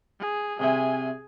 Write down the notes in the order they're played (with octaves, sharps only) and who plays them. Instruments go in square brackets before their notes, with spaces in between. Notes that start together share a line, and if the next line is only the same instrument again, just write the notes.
[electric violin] G#4
[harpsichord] C2 C3 E5 [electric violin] G#4 G#5